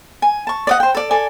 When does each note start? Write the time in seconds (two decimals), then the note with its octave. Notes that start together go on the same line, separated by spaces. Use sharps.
0.22 G#5
0.47 A5 C#6
0.67 D5 D#5 F#5
0.80 C5 G5
0.95 A4 D5
1.11 A4 D5 G#5